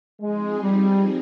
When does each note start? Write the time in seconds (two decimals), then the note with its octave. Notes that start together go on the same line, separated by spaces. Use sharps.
0.22 F3 G#3 C4 D#4 G#4
0.62 G3